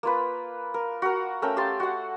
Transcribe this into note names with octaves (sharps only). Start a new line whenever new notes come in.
A#3 F4 B4
A#4
F#4 A#4
A3 C#4 A#4 G5
G4 F5 A5 C6
F#4 F#5